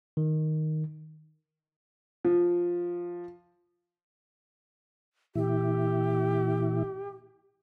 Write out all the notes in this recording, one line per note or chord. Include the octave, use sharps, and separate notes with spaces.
D#3
F3
A#2 E3 E4 G4